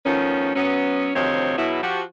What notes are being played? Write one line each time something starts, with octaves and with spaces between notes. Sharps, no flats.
D#3 F3 A3 B3 C#4
F#3 B3 C#4
D2 C3 D#3 F3 C4 C#5
E2 B2 F#3 B3 E4
F3 F#4 G4